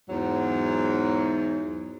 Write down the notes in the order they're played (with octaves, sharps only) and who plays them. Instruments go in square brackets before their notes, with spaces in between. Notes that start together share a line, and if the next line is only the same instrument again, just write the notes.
[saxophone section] E2 G#2 F#3